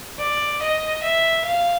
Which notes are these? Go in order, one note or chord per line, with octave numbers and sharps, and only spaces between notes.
D5
D#5
E5
F5